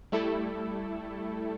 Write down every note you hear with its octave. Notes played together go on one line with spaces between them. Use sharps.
G3 A3 E4 A4